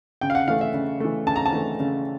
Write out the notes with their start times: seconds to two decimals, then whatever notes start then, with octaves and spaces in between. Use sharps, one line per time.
0.21 C#3 G5
0.30 F5
0.35 F#5
0.48 E3 A3 F5
0.61 E5
0.74 C#3
1.00 E3 A3
1.26 C#3 A5
1.36 A#5
1.46 A5
1.52 E3 A3
1.80 C#3